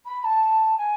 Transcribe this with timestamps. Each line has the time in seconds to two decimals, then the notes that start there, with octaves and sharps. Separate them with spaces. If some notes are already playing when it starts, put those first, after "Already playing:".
0.05 B5
0.24 A5
0.77 G#5